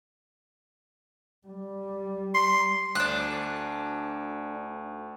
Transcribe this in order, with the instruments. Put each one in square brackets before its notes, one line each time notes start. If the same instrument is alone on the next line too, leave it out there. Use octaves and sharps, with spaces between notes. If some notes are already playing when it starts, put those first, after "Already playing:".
[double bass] G3
[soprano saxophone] C6
[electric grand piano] D2 [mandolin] D4 F#6